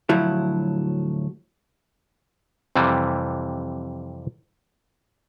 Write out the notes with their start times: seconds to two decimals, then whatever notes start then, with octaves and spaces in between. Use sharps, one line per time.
0.09 D2 A2 F3 F#3 E4
2.76 F2 C3 E3 G3